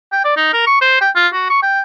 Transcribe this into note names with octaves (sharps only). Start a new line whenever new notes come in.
G5
D5
D#4
A#4
C#6
C5
G5
F4
F#4
C#6
G5